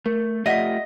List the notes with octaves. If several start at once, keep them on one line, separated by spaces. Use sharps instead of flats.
A3 A#4
A3 F4 G4 D#5 E5 F#5 B6